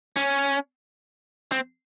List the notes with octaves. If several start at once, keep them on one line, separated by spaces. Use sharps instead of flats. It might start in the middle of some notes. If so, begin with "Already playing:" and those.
C#4
C4